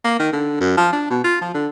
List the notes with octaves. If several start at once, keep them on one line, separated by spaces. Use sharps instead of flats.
A#3
D#3
D3
F#2
F3
D4
B2
F4
F3
D3